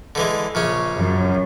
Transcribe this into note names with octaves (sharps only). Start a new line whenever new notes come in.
D3 E3 G#3
A#1 C#3 C#4
F#2